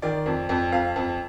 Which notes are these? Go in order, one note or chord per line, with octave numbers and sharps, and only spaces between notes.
D#3 D5
F2
F2
F2 F5
F2 A5